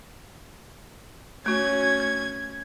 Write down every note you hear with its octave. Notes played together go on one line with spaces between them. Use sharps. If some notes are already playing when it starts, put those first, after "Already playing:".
A3 C#4 F#4 G#6